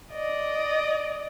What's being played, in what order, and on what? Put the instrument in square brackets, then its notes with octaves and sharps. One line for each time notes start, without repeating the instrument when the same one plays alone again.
[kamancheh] D5 D#5